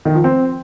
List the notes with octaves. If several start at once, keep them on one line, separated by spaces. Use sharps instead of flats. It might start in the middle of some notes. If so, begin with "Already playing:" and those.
D#3
F3
C4